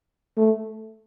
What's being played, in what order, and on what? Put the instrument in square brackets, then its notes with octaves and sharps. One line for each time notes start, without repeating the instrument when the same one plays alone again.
[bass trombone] A3